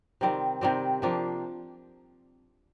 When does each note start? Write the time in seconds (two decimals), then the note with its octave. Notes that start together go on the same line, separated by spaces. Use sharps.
0.21 C3 D#3 G3 C4
0.61 C3 D#3 G3 C4
1.02 C3 F3 A#3 D4